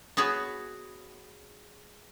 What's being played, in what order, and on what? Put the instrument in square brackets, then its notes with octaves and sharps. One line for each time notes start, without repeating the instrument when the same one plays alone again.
[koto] B3 F#4 G#4 B4 C#5